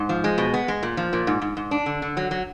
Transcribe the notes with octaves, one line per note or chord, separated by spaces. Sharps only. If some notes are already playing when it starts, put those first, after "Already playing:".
Already playing: G#2
F3
G#3
B2
B3
G#3
A#2
F3
A#2
G#2
G#2
G#2
D4
D3
D3
F#3
F#3